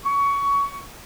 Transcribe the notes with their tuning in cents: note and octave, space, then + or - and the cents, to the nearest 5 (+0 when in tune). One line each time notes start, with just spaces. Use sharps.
C#6 +20